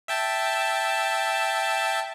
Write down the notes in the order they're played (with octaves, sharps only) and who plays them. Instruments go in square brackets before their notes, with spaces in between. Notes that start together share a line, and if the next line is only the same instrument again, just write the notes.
[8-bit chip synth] E5 G5 A5